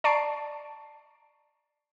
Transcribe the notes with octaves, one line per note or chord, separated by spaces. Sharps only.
D5 A5 A#5 C#6 C7 D7